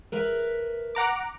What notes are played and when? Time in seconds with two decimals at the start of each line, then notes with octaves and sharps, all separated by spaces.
0.12 A#4 B4 E5
0.95 F#5 A#5 D6